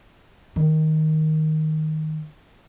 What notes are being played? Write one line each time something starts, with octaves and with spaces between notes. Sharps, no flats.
D#3